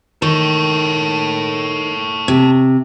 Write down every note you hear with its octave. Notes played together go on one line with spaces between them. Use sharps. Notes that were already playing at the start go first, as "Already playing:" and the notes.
D#3 A4 C#5
C3